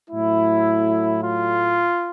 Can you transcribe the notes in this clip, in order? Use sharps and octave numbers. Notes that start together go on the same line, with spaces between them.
A2 F#3 A3 E4
F4